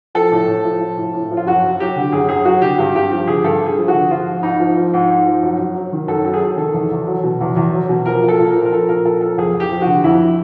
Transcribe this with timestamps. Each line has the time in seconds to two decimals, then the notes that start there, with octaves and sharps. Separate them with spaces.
0.15 F3 A4
0.32 A2
0.47 A2
0.64 F3
0.81 F3
0.97 A2
1.13 A2
1.31 F3
1.37 F4
1.46 F#2 F#4
1.63 F#2
1.80 F#3 G4
1.96 D3
2.12 F#2 G#4
2.29 F#2 G#4
2.45 F#3 F#4
2.62 D3 G4
2.78 G2 G4
2.95 G2 G4
3.11 F3 G4
3.27 D3 G#4
3.44 G2 A4
3.61 G2
3.66 G#4
3.78 F3
3.88 F#4
3.93 D3
4.11 F3 F4
4.27 G#2
4.43 G#2 D#4
4.60 F3
4.77 F3
4.94 G#2
5.10 G#2
5.26 F3
5.43 F#2
5.59 F#2
5.75 F#3
5.92 D#3
6.08 F#2 A4
6.25 F#2 A4
6.34 G#4
6.41 F#3 A4
6.57 D#3 A4
6.74 E2
6.91 E2
7.07 F#3
7.23 B2
7.41 E2
7.56 E2
7.73 F#3
7.89 B2
8.06 F3 A#4
8.23 A#2
8.28 A4
8.39 A#2
8.50 A#4
8.55 F3
8.65 A#4
8.72 F3 A4
8.89 A#2 A#4
9.05 A#2 A4
9.21 F3 A4
9.38 F2 G#4
9.54 F2
9.60 G4
9.71 F3
9.82 F#4
9.87 D3
10.04 F2 E4